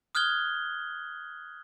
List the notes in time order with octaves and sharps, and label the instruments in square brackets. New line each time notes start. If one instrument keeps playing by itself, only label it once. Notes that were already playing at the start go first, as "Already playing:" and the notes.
[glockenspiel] D#6 F6 F#6 G#6 G7